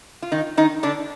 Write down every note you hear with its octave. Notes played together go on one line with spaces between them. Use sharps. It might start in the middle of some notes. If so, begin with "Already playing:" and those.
F4
D#3 D#4
D#3 D#4
D3 D4